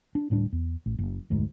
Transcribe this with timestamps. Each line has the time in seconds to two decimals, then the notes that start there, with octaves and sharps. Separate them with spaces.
0.15 D4
0.30 D2 A2 G3 D4
0.52 E2
0.86 A1
0.98 F#1
1.30 F1 D2 G#2